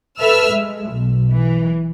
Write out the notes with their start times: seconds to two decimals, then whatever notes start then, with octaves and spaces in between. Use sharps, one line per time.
0.19 A4 B4 E5 E6 F6
0.50 G#3
0.91 B1
1.31 E3